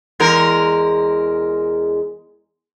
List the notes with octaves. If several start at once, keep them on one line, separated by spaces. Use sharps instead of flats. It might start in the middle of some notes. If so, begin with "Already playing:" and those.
E2 G#3 A#4